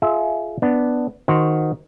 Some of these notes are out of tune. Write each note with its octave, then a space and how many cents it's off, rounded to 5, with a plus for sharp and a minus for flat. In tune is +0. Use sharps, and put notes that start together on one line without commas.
F4 -5 G#4 +30 E5 -15
B3 +0 D4 +0
D#3 +0 F#4 +0 C5 +0